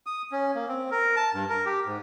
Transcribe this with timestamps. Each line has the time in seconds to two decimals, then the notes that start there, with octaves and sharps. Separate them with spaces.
0.06 D#6
0.32 C#4
0.55 A#3
0.69 C4
0.91 A#4
1.16 A5
1.34 G2
1.49 A#4
1.66 G4
1.86 G#2